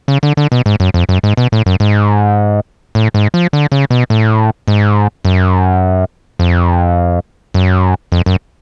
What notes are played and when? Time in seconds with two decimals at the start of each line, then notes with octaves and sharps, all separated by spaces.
0.08 C#3
0.23 D3
0.37 D3
0.52 B2
0.66 G#2
0.80 F#2
0.94 F2
1.09 F#2
1.23 G#2
1.37 B2
1.52 A2
1.66 F#2
1.80 G#2
2.95 A2
3.14 G#2
3.34 F3
3.53 D3
3.72 C#3
3.91 B2
4.10 A2
4.68 G#2
5.25 F#2
6.39 F2
7.54 F#2
8.12 F2
8.26 F#2